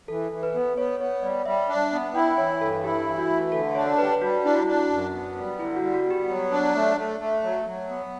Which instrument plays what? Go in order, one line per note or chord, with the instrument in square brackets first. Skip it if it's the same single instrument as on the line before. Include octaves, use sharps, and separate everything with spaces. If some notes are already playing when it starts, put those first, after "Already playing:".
[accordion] E3 [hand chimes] A4
[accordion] E3
[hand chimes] B4
[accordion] B3
[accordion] B3 [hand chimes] C#5
[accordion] B3 [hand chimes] C#5
[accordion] G3 [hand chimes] D5
[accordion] G3 [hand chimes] E5
[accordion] D4
B3
[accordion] E4 [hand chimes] G5
[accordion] E3 [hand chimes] C#5
[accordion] G2 [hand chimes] A4
[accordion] E4 [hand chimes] G4
[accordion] E3
[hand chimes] F#4
[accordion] A3
[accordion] D3 [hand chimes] A4
[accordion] D4 [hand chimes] C#5
[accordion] G3 [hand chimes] B4
[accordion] G3 [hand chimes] F#4
[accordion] D4 [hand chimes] E4
[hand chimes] F#4
[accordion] D4
F#2
B3
G3
[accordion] D3 [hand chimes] E4
[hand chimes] F#4
[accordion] G3
[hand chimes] F#4
[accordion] B3
[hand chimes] G4
[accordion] F#3
D4
A3
A3
A3
F#3
F#3
B3